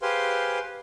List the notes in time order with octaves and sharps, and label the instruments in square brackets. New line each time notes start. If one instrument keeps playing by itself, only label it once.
[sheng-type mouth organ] G4 G#4 B4 C5 F5 C6